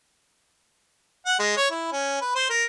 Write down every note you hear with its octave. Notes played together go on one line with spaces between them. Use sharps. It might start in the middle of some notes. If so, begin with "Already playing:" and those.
F#5
G#3
C#5
E4
C#4
B4
C5
A#4